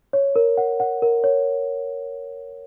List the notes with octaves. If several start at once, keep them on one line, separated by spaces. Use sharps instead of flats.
C#5
A#4
F#5
F#5
A#4
C#5